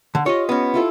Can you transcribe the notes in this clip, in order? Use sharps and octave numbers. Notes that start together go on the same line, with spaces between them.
D3
F4 G4 C#5 D#5
B3 C#4
E4 F4 A4